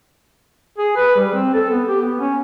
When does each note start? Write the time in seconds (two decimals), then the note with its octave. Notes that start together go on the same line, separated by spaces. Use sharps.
0.78 G#4
0.96 B4
1.16 G3
1.33 C4
1.54 A4
1.70 B3
1.88 G4
2.01 B3
2.20 C#4